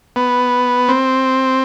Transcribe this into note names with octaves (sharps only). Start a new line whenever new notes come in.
B3
C4